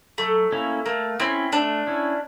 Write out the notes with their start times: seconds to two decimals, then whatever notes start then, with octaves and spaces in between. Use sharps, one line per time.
0.18 F#3 A3
0.52 A#3 C#4 E4
0.86 A3 A#3
1.20 C4 C#4 E4
1.52 A3 D4
1.87 C#4 E4